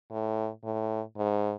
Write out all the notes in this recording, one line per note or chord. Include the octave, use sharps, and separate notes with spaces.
A2
A2
G#2